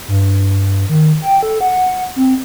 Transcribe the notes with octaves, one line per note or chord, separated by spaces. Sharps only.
G2
D#3
G5
A4
F#5
C4